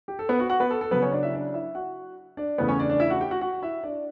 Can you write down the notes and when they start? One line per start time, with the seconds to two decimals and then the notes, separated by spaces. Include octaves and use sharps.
0.08 G4
0.19 A4
0.29 B3 B4
0.39 F#4 F#5
0.50 F#4 F#5
0.60 B3 B4
0.71 A4
0.81 A4
0.91 C#3 F#3 B3 B4
1.02 C#4 C#5
1.12 D4 D5
1.23 E4 E5
1.33 D4 D5
1.54 E4 E5
1.75 F#4 F#5
2.37 D4 D5
2.58 E2 C#3 E3 A3 B3 B4
2.68 C#4 C#5
2.79 D4 D5
2.89 D4 D5
3.00 E4 E5
3.10 F#4 F#5
3.21 G4 G5
3.31 F#4 F#5
3.41 F#4 F#5
3.62 E4 E5
3.83 D4 D5